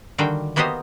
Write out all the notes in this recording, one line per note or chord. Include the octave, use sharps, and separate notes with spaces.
D3 D#3 G3 F#4 F5 G5
A#3 B3 F#4 G4 C5 D#5